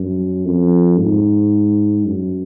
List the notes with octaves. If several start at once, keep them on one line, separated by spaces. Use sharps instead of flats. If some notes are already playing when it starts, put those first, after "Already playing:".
Already playing: F#2
F2
G#2
F#2